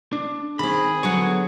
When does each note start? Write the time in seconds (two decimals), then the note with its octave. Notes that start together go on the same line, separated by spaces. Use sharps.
0.13 D4
0.59 D#3 C4 G#4 B5
1.03 D3 F#3 B3 C#5 F#5